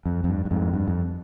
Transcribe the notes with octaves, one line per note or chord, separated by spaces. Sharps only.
F2
F2
G2
G2
F2 G#2
G2
F2